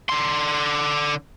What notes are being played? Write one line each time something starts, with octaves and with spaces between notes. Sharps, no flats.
D3 C6